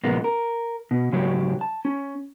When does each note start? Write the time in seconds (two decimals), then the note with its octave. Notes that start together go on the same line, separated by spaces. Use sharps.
0.04 A#2 C#3 F3 G#3 A#3 B3
0.24 A#4
0.91 B2
1.12 G#2 C#3 F#3 G4 C#5
1.61 A5
1.85 C#4